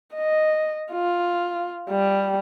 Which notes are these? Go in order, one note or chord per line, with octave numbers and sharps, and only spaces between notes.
D#5
F4
G3